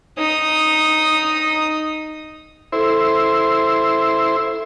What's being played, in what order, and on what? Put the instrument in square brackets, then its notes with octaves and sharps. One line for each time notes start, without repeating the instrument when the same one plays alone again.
[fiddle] D#4 D#6
[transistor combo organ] E4 C5 [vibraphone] A4